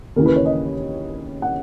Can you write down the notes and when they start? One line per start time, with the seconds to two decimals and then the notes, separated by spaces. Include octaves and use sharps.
0.16 D#2 C#3 E3 A#4
0.26 B4
0.36 C#5
0.45 D#5
1.42 F#5